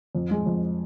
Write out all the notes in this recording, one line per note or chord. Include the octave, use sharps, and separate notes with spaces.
F2
G#3
F2